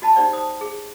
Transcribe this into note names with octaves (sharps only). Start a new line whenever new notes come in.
F#4 D#5 A5 B5
D#4 G4 C5 D5 F#5
C5 D#6
G#4